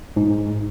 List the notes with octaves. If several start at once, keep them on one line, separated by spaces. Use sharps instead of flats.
G#2